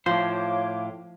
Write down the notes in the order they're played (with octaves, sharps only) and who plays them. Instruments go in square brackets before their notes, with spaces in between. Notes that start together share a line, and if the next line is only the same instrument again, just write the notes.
[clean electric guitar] A2 C5 [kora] F3 [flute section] C#5 F5 D6